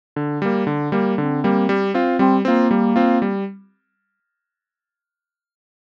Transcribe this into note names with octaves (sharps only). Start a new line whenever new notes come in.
D3
G3 A#3
D3
G3 A#3
D3 C4
G3 A#3
G3
C4 F4
G3 C4
A#3 C4 F4
G3
C4 F4
G3